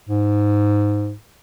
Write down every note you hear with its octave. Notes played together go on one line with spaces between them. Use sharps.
G#2